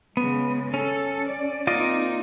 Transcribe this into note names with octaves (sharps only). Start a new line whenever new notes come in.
C#3 G#3 B3
C#4 A4
D5
A#3 C4 D#4 F4 D5 D#5